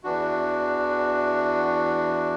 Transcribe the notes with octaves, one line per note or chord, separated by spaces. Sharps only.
E2 E3 D4 F#4